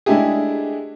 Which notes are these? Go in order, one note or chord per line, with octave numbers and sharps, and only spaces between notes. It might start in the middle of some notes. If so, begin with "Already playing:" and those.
G#3 A3 D4 E4 G4 G#4